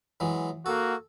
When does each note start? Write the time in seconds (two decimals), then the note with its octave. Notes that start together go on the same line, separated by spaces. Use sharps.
0.20 E3 F#3 G#3
0.66 A#3 F#4 A4